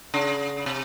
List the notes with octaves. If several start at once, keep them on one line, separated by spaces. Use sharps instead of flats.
C#3
C3